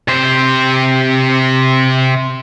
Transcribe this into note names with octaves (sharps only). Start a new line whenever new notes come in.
C3 C5